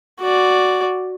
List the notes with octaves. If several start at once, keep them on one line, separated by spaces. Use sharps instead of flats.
F#4 D5